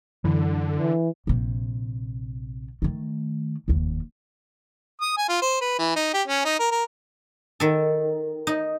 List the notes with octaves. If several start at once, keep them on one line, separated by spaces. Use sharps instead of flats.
F#2 D3 E3
E3
A#1 C3
D#3 A3
F1 D#2
D#6
G#5
F4
C5
B4
E3
D#4
G4
C#4
D#4
A#4
A#4
D#3 A4
D#4